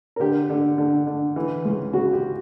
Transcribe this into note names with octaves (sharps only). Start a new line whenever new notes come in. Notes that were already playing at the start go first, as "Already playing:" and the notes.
A#4
D3 G4
D3
D3
D3
E3
C#2
C#3 F#4
G4